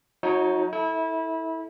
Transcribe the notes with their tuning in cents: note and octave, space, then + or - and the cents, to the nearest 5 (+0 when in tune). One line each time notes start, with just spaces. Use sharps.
F#3 -25 D#4 +25 C#5 +0
E4 -25 A4 +0